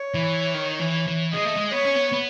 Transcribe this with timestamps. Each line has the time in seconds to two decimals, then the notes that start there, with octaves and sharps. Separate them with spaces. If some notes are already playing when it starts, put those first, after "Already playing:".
Already playing: C#5
0.14 E3
0.54 D#3
0.80 E3
1.07 E3
1.33 G#3 D#5
1.45 A3
1.57 G#3
1.72 B3 C#5
1.85 C#4
1.96 B3
2.13 B3